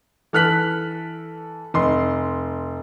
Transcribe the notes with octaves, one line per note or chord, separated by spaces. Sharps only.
E3 A4 F6 F#6 B6 F#7
F1 C6